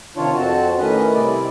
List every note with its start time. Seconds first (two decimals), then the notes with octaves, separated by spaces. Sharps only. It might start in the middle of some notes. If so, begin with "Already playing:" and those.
0.17 C3 D#3 D4 F4 C#5
0.34 F2 C4 F#4 A5
0.78 A2 D#3 C#4 B4 D#5
1.14 C3 G3 E4 D5